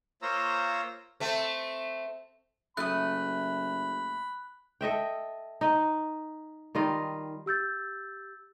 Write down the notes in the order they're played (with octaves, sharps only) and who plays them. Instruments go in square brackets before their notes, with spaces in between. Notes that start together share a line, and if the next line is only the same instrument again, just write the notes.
[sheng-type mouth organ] A#3 F4 C5 C#5 A#5 E6
[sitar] A3 C4
[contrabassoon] F#1 [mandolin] A3 D#6 [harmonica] B5 [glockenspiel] F#6
[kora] A4 D#5 E5 G5
D#4 D#5
D#3 G3 F4 D#5
[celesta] G4 E6 G6 A6